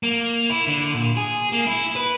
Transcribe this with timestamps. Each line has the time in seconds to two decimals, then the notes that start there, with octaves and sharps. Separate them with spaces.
0.03 A#3
0.50 E4
0.67 D3
0.94 A#2
1.17 G#4
1.52 A#3
1.67 E4
1.96 B4